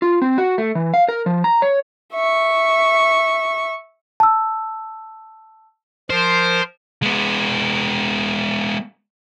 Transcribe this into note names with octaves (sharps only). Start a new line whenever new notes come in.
F4
C4
F#4
A3
E3
F5
A#4
F3
A#5
C#5
E5 C#6
A5 E6
F3 A#4 C5
G#3 B3